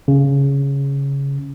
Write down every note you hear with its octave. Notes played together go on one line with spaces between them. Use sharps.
C#3